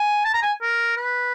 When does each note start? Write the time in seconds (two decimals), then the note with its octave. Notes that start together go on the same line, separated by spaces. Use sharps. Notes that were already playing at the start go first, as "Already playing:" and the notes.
Already playing: G#5
0.25 A5
0.34 A#5
0.42 G#5
0.62 A#4
0.97 B4